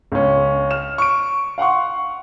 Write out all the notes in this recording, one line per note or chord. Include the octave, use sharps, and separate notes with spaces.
C#2 C#4
F6 E7
C#6 D7
F5 F#5 C6 C#6